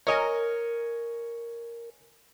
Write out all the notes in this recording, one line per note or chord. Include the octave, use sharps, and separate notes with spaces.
A#4 C#5 D#5 G#5